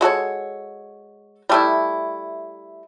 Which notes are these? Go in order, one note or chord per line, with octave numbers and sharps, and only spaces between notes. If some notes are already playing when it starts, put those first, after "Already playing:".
G#3 F#4 A4 C#5
G3 A3 E4